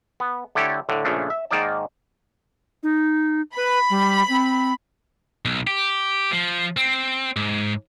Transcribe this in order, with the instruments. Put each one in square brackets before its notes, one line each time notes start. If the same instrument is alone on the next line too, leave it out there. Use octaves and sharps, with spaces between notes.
[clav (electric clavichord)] B3
D3 A3 E4 G4 A4 C#5
A2 D3
A#1 C#3 F3 A3 D4
E5
G#2 D#3 A#3 D#4 D5 A5
[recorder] D#4
[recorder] B4 [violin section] B5
[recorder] G3
C4
[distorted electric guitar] B1
G4
F3
C4
G#2